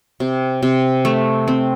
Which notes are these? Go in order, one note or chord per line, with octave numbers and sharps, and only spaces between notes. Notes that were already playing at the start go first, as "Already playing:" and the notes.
C3
C3
A3
C4